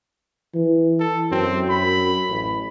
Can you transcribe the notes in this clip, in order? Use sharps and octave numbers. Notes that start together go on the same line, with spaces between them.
E3
A4
F#2 C4
B5
A1